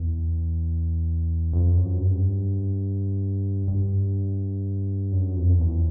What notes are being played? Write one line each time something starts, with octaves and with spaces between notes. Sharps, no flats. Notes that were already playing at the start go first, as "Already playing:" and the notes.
Already playing: E2
F2
F#2
G2
G2
F#2
F2
E2